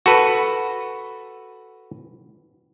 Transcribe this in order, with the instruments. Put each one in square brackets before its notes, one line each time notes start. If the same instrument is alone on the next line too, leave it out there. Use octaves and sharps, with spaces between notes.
[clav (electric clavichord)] F#4 A4 B4